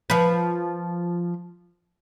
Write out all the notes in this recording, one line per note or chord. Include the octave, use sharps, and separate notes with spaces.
F3 B4